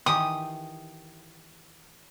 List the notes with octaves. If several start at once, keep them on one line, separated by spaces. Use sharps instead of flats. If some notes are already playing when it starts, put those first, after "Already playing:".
D#3 E3 G4 D#6